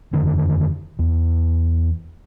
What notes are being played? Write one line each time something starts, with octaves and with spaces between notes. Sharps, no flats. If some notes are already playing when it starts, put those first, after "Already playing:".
F2 D3 D#3
E2